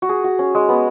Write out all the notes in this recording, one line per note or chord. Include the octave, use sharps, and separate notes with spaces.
F#4
G#4
F#4
C#4
G#3
B3